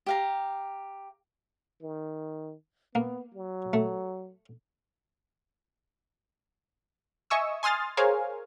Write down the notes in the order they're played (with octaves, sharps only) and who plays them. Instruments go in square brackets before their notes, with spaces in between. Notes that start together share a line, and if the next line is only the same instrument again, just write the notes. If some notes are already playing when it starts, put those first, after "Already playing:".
[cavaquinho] G4 F5 A#5
[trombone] D#3
[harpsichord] A#3 [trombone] B3
[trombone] F#3
[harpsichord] A3
[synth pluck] D#5 E5 G#5 C#6 D#6 E6
G#5 C6 D#6 F6 A6
G#4 A#4 C5 C#5 F5 G#5